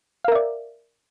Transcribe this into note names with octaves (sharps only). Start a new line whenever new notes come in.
A#4 D5 E5 F5